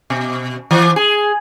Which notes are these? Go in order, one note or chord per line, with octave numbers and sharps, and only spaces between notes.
B2
E3
G#4